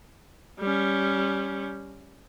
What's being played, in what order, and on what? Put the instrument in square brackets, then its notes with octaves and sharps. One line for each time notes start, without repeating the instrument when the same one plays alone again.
[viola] G3 C#4